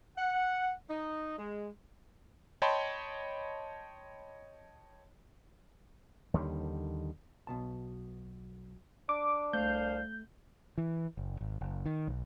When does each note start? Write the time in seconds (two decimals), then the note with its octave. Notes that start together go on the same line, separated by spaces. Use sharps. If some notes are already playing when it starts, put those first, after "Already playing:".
0.17 F#5
0.90 D#4
1.38 G#3
2.62 C#5 D#5 G5 A5 B5 C6
6.34 D#2 D3 D#3 G3
7.47 B1 B2 A5
9.09 D4 D6
9.53 C2 A3 C5 F5 G6
10.78 E3
11.17 F#1
11.41 G#1
11.61 F#1
11.86 D#3
12.07 B1